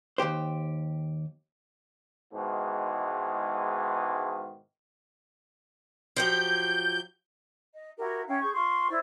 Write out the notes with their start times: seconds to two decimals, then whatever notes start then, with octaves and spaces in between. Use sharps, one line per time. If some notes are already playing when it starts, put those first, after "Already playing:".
0.18 D#2 A#2 G4 C5
2.34 G#2 B2 D#3 E3 G#3
6.16 F3 F#3 G4 G6
7.73 D#5
7.97 E4 F#4 G4 A#4
8.26 C#4 E4 F5 G5
8.41 G#4 C#6 G6
8.53 F4 C6 C#6
8.89 E4 C5 D5